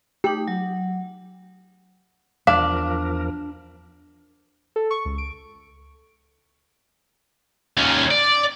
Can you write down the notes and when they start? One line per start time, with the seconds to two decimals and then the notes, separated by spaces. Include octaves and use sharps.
0.24 A3 D#4 G4
0.48 F#3
2.47 E2 F3 D4 A#4 F5
4.76 A4
4.91 C#6
5.05 C#2
5.18 D7
7.77 D#2 C#4
8.11 D5